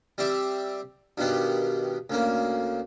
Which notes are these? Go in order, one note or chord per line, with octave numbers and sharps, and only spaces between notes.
G3 C4 G4 D5 E5
G2 B2 D#3 B3 G4
D2 C#3 A#3